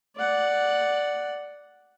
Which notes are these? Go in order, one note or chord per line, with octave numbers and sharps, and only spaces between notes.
D5 F#5